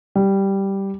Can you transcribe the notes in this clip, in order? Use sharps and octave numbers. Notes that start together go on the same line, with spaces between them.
G3